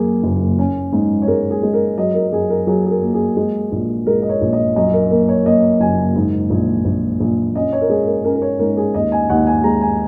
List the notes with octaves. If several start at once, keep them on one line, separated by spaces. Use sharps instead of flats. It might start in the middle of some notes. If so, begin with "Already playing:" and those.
Already playing: F#2 A#3 G#4
F#1
C#4
G#2
C#5
G#3 A#4
G#4
G#3
A#4
F#3 D#5
A#4
F#2 G#4
A#4
F#3 G#4
G#4
A#4
A#3
G#4
G#3
A#1
G#3 A#4
D#5
C#5
A#1
D#5
F#2 D#5
A#4
A#3 A#4
C#5
A#3 D#5
F#1 G#5
G#2
A#1
A#1
A#1
C#4 D#5
C#5
A#4
G#3 G#4
A#4
C#4 A#4
A#4
C#5
G#2 A#4
G#4
D#2 D#5
G#5
D#2 F#5
G#5
G#3 A#5
G#5